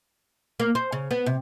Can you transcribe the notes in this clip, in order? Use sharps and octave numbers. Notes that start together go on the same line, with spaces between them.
A#3
C5
C#3
B3
C3